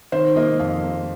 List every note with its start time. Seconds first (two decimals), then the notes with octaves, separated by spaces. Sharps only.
0.12 D#3 C5
0.36 A#3 D#5
0.60 F2 F5
0.84 A#3